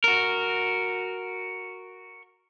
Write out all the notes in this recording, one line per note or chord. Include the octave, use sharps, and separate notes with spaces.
F#4 A#4